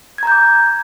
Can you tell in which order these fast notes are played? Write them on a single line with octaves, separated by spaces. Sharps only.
G#6 A#5 G6 D6